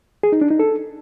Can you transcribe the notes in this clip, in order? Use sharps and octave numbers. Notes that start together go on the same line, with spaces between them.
G#4
D#4
D4
D#4
A4